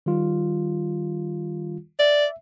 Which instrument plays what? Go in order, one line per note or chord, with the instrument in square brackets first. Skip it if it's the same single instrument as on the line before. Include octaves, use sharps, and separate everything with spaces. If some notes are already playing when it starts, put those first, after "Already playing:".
[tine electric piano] D#3 G3 F4
[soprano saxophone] D5 [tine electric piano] E5